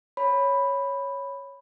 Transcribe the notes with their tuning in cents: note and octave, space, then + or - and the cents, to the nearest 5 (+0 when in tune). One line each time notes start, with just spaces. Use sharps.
C#5 +0 B5 +0